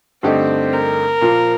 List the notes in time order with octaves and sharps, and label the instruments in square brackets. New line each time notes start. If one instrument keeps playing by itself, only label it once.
[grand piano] G2 D3 A3 D#4 G4 [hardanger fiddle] C4
[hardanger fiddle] A#4
[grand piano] A#2 F3 A#3 F4